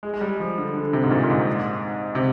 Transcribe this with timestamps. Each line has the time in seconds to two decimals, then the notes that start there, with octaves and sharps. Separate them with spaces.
0.03 G#3
0.13 G#3
0.21 G3
0.40 F3
0.58 D3
0.75 D3
0.93 C3
1.03 G#2
1.11 A#2
1.24 A#2
1.30 G#2
2.15 C3